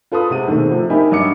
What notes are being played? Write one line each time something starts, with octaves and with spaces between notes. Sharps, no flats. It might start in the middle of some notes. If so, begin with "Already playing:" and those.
F4 A4 B4 C6 D#6
C3 G#3 F#5 D#7
D#2 B2 D#3 G#3 A3 C4
C3 F3 A3
D#4 G4 A#4 E5 G#5 B5
G2 F#3 D#5 D6 C#7